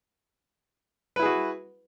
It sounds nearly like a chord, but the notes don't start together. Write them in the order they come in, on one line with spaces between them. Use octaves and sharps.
B4 E4 G#4 F#4